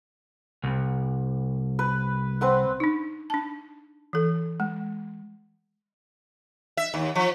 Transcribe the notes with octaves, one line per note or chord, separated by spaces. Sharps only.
C2
B4
C4 B4 F#5
D4 D#4
D4 A5
E3 A4
G#3
E5
D#2
F3